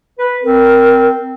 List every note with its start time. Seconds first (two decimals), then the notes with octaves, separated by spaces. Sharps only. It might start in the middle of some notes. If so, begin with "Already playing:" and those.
0.18 B4
0.43 C4 A#4